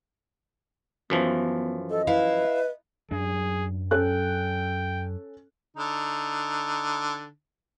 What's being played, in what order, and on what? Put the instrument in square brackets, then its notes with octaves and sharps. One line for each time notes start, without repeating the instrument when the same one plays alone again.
[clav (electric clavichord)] F#2 E3 F3 [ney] B3
[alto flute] A4 [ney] D#5
[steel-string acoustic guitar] E4 F5 [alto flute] B4
[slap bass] F#2 F#3 D4 [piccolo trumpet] G#4
[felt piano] C#4 A4 F#6 [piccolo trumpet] G5
[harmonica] D3 D#4